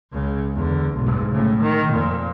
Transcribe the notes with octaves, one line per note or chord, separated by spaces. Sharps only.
C#2 C#3
E2 D3
B1 G#2
A2 C#3
D#3
F2 A#2